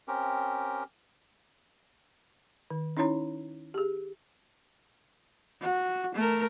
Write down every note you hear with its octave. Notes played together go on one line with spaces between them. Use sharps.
C4 C#4 G4 A#4
D#3
C#4 D#4 E4 C#5 A#5
G4 G#4
F#4
A3 A#4